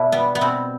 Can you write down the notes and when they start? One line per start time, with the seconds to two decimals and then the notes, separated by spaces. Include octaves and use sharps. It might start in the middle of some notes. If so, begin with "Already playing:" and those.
Already playing: B2 D4 E4
0.12 G3 B3
0.35 B3
0.41 B2 C4